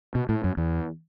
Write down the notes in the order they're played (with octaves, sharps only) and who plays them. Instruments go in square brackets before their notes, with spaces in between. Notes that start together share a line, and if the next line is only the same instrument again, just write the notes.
[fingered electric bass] B2
A2
F#2
E2